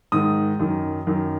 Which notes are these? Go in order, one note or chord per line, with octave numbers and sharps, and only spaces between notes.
G#2 D#3 D#6
F#2 D#3
F#2 D#3